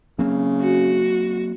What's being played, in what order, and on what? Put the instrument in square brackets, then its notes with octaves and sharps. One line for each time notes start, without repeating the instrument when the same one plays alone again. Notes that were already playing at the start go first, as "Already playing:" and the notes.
[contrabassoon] C#3 [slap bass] F#3 A#3 C4
[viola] F#4